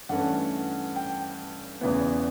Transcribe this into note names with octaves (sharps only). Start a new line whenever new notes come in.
G2 E3 A3 C#4 F#5
G5
E1 E2 C#3 E3 B3